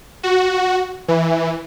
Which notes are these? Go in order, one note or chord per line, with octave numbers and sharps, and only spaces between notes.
F#4
E3